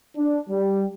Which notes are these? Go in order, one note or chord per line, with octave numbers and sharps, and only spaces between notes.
D4
G3